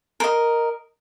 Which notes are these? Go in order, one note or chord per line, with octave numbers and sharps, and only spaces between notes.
A#4 D#5